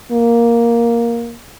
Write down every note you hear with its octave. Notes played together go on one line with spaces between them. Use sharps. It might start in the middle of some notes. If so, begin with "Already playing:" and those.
A#3